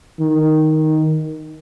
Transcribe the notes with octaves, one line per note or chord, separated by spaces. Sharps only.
D#3